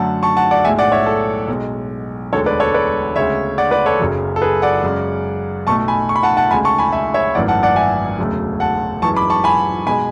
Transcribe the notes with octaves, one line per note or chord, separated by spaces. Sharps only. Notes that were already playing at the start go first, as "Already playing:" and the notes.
Already playing: F#2 D3 F#3 A3 F#5 A5
A5 C#6
F#5 A5
D5 F#5
B1 A2 G#3 E5 G#5
D5 F#5
C#5 E5
A4
B1 B2 G#3
E1 D2 D3 G#3 A4 C#5
B4 D5
A4 C#5
B4 D5
D2 C#3 G#3 C#5 E5
D5 F#5
B4 D5
A4 C#5
F#1 F#2 C#3 F#3
A4
G#4 B4
D5 F#5
F#2 C#3 G#3
B1 B2 A3 A5 C#6
G#5 B5
C#6
B5
F#5 A5
F#5 A5
D2 C#3 G#3 G#5 B5
A5 C#6
G#5 B5
E5 G#5
C#5 E5
G#1 F#2 E3 A3 D5 F#5
F#5 A5
D5 F#5
E5 G#5
E1 D2 C#3 F#3 A3
F#5 A5
F#2 E3 G#3 A5 C#6
B5 D6
A5 C#6
G#5 B5
B2 G#3 G#5 B5